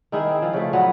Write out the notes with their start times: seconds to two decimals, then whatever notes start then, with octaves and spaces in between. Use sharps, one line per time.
0.12 D#3 D#4 E4 G#4
0.29 C4
0.42 F3
0.53 C#3 A3
0.73 A#2 F#3 B3